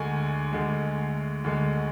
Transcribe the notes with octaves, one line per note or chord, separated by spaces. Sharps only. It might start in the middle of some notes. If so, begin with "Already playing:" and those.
Already playing: D2 D3 G#3 G#5
D2 D3 G#3
D2 D3 G#3